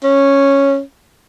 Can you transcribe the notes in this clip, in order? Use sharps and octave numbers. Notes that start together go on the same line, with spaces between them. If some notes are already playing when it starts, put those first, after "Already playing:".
C#4